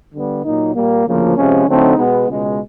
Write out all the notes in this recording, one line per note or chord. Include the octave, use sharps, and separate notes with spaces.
D3 G3 B3
A#2 F#3 A#3 D#4
A#2 G3 A#3
D2 C#3 F3 A#3
C3 F3 G#3 C#4
D3 F#3 A3 C4 D#4
B2 G#3 B3
C#2 B2 G#3